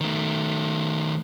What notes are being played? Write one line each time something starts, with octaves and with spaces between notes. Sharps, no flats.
D#3 A3